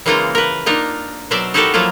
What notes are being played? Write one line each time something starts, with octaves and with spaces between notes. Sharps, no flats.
C#3 E3 G#3 A#3 D#4 F4
A#4 B4
A#3 D4 D#4 F4 A#4
B2 F#3 A#4 C5 D5 E5
D#4 E4 F#4 G4 A4 A#4
F3 F#3 A#3 E4 F4